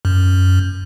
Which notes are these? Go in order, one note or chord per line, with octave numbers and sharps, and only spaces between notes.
F#2